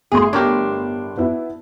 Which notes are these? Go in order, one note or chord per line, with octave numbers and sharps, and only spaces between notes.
G1 A2 G#4 C6
D4 G4 A#4 C#5
B3 E4